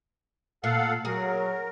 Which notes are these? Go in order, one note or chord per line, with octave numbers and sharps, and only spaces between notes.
A#2 A4 F5 F#5
F#3 G#4 A#4